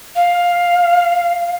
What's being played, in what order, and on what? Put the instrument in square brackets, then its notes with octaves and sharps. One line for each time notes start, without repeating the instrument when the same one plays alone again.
[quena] F5